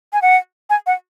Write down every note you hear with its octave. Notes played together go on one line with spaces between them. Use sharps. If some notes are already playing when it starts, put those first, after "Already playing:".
G#5
F#5
G#5
F#5